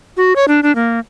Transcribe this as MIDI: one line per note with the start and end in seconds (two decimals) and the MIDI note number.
0.17 0.33 66
0.36 0.45 73
0.48 0.61 62
0.63 0.74 62
0.75 0.99 58